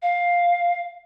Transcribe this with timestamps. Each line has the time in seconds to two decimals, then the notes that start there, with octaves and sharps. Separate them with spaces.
0.02 F5